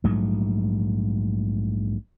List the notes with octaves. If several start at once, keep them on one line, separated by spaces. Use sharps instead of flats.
A#1 G#2 F#3 A3